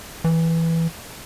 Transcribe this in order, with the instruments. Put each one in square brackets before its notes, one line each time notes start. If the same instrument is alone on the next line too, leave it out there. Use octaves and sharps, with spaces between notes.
[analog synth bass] E3